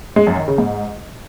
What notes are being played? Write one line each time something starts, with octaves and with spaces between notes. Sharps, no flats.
G#3
F#2
D#3
C#3
G#2